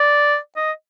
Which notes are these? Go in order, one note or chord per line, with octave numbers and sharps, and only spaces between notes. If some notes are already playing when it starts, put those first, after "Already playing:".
Already playing: D5
D#5